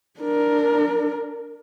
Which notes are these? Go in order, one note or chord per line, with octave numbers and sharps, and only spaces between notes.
D4 A#4